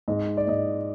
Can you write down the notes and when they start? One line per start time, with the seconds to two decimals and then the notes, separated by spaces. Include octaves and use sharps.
0.08 G#2 D#5
0.37 D5
0.47 G#2 D#5